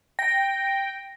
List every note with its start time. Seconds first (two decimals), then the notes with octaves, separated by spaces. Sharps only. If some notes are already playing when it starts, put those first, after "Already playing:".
0.19 G5 A#6